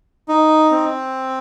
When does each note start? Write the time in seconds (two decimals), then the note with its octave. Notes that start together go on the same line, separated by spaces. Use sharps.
0.29 D#4
0.71 C4